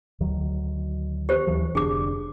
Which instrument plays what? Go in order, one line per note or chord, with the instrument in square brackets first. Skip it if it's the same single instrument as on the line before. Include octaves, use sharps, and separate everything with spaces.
[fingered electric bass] D2 D#3 F#3
[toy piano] G4 C5
[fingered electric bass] D#2 E3 F#3
[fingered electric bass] F1 D3 D4 [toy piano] G#4 D6